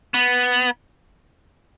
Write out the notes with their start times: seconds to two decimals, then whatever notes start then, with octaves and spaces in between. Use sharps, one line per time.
0.14 B3